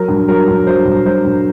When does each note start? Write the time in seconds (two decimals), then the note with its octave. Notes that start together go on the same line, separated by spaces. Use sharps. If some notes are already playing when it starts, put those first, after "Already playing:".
Already playing: F#3 A#4
0.08 G2
0.28 F#3 A#4
0.48 G2
0.66 F#3 C5
0.85 G2
1.05 F#3 C5
1.25 G2